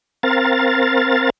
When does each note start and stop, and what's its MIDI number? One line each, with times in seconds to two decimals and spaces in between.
0.23 1.30 60
0.23 1.30 70
0.23 1.30 77
0.23 1.30 93